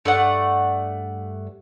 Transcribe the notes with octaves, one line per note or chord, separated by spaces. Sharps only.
G2 A3 D5 F#5